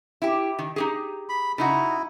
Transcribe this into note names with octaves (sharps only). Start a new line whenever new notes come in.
E4 G4
D#3
D#4 G4 G#4
B5
C#3 D#4 E4 F#4